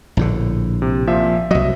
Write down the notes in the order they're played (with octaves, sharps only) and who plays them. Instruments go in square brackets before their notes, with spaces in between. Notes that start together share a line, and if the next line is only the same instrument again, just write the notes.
[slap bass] A#1 A2 D3
[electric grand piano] C3
A#2 F3 E5
[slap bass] C2 F#3 [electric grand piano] D#5 E5